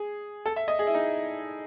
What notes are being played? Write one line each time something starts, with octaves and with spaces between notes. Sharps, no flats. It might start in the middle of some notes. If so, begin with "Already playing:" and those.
Already playing: G#4
A4
E5
D#5
G#4
E4
D#4